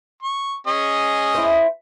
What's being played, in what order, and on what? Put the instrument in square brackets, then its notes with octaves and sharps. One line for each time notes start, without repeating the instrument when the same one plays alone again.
[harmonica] C#6
C#4 G#4 D#5
[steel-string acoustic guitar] E4 C5